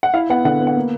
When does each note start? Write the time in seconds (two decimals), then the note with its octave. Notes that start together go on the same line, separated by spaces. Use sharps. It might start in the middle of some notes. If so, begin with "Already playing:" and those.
0.03 F#5
0.14 E4 F5
0.30 B3 F#5
0.45 D3 F#5
0.61 B3
0.67 F#5
0.77 A#3